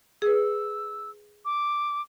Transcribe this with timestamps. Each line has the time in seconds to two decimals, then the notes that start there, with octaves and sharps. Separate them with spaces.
0.22 G#4 B4 E6
1.45 D6